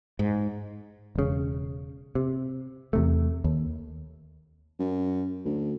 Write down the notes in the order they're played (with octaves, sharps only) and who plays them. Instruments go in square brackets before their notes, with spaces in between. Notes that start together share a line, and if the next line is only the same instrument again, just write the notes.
[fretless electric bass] G#2
[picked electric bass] E1 C#3
C3
E2 C3 A3
D#2
[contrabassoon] F#2
D2